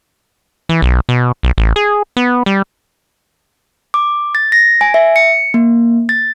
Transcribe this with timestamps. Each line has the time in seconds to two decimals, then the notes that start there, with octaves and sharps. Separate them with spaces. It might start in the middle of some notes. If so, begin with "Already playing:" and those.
0.69 E3
0.82 B1
1.09 B2
1.43 B1
1.58 A1
1.76 G#4
2.17 B3
2.46 G3
3.94 D6
4.35 A6
4.52 A#6
4.81 G#5
4.94 E5
5.16 C#7
5.54 A#3
6.09 A6